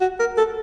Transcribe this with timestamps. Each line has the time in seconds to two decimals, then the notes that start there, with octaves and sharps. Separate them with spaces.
0.01 F#4
0.19 A#4
0.38 A4